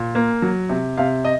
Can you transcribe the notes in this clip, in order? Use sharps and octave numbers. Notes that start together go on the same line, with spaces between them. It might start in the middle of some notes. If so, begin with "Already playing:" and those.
Already playing: A#2
A#3
F#3
C3
C3 F5
D#5